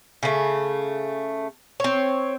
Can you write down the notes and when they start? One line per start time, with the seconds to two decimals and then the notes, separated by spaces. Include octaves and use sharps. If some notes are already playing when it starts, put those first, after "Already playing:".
0.23 C#3 A3
1.80 C4 C#5